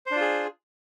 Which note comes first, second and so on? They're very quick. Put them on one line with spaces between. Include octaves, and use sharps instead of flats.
C5 D4 F4 G#4